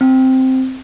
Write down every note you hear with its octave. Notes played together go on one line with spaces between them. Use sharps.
C4